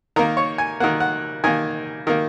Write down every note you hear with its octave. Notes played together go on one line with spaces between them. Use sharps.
D#3 A#3 A#4
C#5
G#5
D#3 A#3 F#5
F#5
D#3 A#3 G#5
D#3 A#3